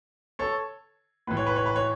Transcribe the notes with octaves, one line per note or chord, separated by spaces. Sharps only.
A4 C#5
A2 E3 B4
C#5
B4
C#5
B4
C#5